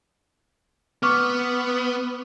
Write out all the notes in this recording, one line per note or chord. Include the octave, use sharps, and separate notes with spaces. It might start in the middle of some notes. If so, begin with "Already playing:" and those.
B3 C#6 D6 F6